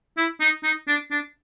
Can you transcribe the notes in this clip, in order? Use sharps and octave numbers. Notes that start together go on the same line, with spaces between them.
E4
D#4
D#4
D4
D4